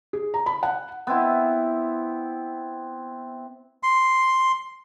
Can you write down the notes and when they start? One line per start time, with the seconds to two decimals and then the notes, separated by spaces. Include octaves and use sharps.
0.13 G#4
0.34 A#5
0.46 B5
0.63 F#5
1.07 B3 C4 E4
3.83 C6